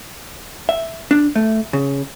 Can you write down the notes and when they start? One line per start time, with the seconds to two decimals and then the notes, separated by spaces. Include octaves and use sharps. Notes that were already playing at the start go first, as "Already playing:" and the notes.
0.69 E5
1.11 D4
1.36 A3
1.73 C#3